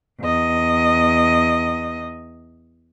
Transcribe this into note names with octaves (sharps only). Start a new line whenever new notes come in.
E2 D#5